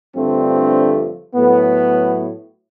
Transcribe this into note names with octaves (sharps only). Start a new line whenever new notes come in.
G2 D3 F3 A3 C4
A2 F#3 A3 B3